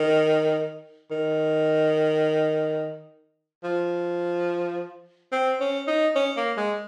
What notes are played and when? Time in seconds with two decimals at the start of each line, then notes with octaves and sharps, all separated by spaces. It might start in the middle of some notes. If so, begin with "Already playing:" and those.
Already playing: D#3
1.11 D#3
3.64 F3
5.32 C4
5.60 C#4
5.88 D#4
6.16 C#4
6.37 A#3
6.57 G#3